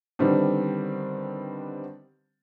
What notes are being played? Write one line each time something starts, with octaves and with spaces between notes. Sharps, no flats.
D3 D#3 G3 B3 C4 D4